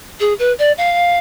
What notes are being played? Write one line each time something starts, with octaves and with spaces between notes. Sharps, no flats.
G#4
B4
D5
F5